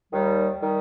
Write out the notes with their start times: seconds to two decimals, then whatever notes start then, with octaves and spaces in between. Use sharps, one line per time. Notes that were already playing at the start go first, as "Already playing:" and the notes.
0.13 D#2 D#3 G3
0.59 D#3 G3